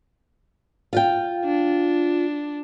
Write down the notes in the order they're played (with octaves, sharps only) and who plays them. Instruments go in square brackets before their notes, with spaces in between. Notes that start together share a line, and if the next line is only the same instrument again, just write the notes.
[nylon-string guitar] F4 F5 G5
[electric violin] D4